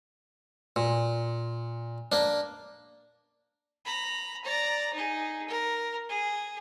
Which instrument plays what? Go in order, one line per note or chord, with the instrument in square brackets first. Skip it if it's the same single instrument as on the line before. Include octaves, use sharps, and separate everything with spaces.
[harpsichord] A#2
A#3 D4
[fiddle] A#5 B5
D5 A#5
D#4 G#4
A#4
G#4